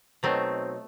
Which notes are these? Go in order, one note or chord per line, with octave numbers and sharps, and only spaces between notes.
B2 F#3 A3 C4 D#4